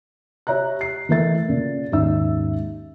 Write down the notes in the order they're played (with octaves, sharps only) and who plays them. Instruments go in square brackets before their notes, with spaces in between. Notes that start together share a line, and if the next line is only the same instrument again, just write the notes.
[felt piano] G4 C#5 E5 A#5 F#6
C7
E3 A3 A#4 E5 A6
A#2 C#3
D#2 G#2 C#4 D#4 E5 E6